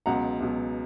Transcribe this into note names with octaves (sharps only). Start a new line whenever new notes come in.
C#2 B2 F#3 F#5 A#5
C#2 B2 F#3